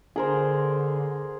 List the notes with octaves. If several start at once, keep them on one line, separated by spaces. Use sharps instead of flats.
D3 G#4 A#4 C5